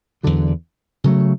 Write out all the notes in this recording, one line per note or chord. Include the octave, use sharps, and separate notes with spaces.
E2 D3 F#3
C#3 F#3 A3